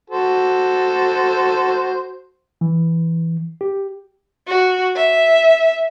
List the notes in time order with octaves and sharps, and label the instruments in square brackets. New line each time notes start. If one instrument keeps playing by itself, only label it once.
[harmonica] F#4 A4 C5
[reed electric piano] E3
G4
[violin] F#4
E5